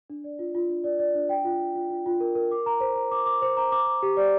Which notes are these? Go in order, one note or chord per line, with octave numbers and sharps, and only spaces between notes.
D4
D5
F4
F4
D4
D5
D5
D4
G5
F4
F4
F4
F4
F4
A#4
A#4
D6
A#5
C5
A#5
D6
D6
C5
A#5
D6
D6
G4
D5